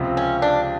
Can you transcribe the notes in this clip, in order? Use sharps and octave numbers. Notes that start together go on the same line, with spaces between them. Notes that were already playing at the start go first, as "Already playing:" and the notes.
Already playing: C#2 C3 F3
C#4
D4